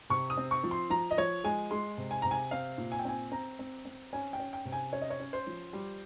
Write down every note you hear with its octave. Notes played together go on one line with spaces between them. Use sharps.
C3 C#6
D#6
C4
C#6
F3
C6
F3 A#5
D#5
F3 C#5
G#3 G#5
G#3 C6
C3
G#5
C3 A#5
G#5
C4 F5
A#2
G#5
G5
C4 G#5
C4 A#5
C4
C4
C#4 G#5
G5
C#4
G5
C3
G#5
C#4 C#5
D#5
C#5
C#4
C5
F3
G3